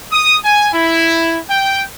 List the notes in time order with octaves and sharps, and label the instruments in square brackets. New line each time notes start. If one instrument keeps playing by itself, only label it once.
[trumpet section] D#6
G#5
E4
G5